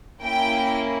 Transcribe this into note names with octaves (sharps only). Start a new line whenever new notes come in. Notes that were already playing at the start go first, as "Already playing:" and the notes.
A#3 C#4 E4 G5